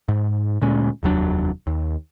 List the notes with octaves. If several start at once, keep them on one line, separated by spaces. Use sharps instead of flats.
G#2
D2 A#2 G#3 C#4
F1 D#2 F#3 D4
D#2